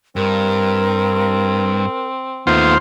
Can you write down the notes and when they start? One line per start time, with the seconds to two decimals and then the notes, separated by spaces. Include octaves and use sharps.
0.16 G2 C4 A#4
2.47 D#2 A3 B3 F4 C5